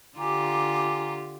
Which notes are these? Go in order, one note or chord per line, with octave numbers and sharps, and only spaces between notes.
D3 F4 G4 G#5 A#5 D6